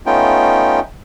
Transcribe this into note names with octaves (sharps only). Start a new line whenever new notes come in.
A3 B3 C#4 D#4 F4 G5